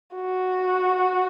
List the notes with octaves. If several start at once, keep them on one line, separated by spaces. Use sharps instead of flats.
F#4